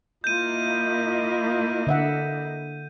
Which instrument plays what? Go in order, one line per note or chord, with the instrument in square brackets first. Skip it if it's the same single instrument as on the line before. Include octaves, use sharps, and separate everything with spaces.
[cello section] A#3 E4 D#5 [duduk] F4 [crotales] G6 D#7
[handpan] D3 E5 F#5